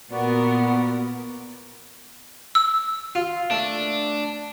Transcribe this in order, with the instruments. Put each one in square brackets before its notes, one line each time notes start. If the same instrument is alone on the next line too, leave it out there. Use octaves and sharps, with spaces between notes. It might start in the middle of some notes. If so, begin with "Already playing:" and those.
[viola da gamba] A#2 A#4 [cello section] B3 [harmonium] F#4 D5
[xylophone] E6
[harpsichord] F4
[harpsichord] A3 [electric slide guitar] D4